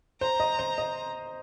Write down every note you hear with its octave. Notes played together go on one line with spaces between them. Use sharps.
C5 A#5
D#5
C5
D#5